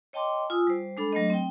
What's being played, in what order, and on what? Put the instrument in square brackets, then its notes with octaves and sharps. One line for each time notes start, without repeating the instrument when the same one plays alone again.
[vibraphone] C#5 D#5 G5 A5 C6 D6
F4 G#5 D#6 E6
G3 C5
G#3 D4 A4 B5
F#3 A3 D4 D#5
C4 G5